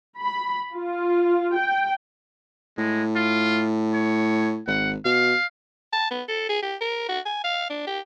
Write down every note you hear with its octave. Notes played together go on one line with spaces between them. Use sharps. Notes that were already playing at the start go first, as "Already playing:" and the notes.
B5
F4
G5
A2 G#3
F4
C#5
G#1 F#5
B2 F5
A5
B3
A4
G#4
G4
A#4
F#4
G#5
F5
D4
G4